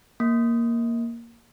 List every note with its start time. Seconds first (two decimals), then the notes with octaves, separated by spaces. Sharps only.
0.20 A#3